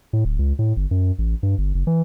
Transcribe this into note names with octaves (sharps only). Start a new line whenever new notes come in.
A2
D1
C#2
A2
G1
F#2
A1
G2
G1
F#1
E3